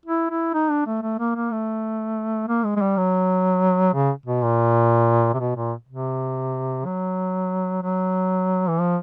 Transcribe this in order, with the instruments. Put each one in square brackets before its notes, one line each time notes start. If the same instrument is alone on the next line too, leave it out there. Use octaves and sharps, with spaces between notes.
[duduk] E4
E4
D#4
D4
A3
A3
A#3
A#3
A3
A#3
G#3
G#3
G3
F#3
C#3
B2
A#2
C3
B2
A#2
C3
F#3
F#3
E3
F3